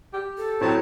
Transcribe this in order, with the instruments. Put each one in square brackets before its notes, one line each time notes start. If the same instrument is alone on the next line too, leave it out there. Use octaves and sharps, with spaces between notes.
[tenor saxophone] G4
[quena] A4
[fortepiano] A2 F#3 [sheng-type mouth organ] C4 C#5 A5